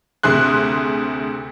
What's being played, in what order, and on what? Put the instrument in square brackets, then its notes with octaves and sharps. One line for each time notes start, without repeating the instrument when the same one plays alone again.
[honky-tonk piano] D2 C3 G#4 C6 F#6